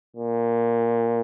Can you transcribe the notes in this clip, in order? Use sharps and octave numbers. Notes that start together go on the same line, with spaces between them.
A#2